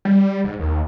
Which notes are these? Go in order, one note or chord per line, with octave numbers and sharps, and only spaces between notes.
G3
G#2
D#2